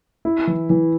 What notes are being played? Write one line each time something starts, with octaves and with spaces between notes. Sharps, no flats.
E4
E3
E3